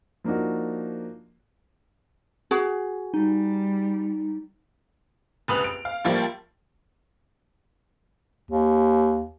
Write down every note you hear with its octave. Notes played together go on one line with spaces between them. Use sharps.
F3 A#3 D4 D#4 F#4
F#4 G#4
G3 D#4
F1 C#2 B4 D#6 F7 F#7
D7
F5
A2 F3 G3 A#3 F4
D#2